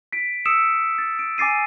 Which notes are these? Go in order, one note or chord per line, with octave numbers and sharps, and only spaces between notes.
B6 D7
D#6 E6 C#7 D7 E7
A6
D7
G#5 D6 A6 C7 D#7